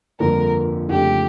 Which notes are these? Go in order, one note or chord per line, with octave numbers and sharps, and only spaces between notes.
G1 F2 D3 F3 A#3 A#4
F2 C#3 F3 A3 D4 G4